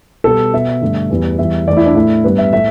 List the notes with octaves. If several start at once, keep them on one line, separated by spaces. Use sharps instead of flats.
B2 G3 B3 A4
B2 B3 E5
G2 D3 A3
E2 E3 G3 B3
E2 E3 G3 E5
E2 E3 A3 D5
E4
D4
A2 A3 E4
G2 G3 B3 B4
E5
A2 A3 E5